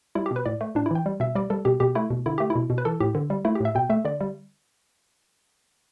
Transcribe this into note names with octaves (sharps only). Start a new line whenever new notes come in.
G3 E4
G4
B2 B4
A2 D5
A3
A2 D4
E4
E3 G5
G3
B2 E5
G3 D5
G3 A4
B2 G4
B2 G4
A3 E4
B2
D3 E4
A3 G4
E4
B2
B2
B4
E3 A4
A2 G4
D3
G3
A3 E4
G4
A2 E5
B2 G5
A3 E5
D3 D5
G3